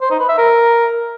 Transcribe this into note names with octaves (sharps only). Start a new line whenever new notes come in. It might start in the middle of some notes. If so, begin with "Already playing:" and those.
C5
D#4
B4
E5
A#4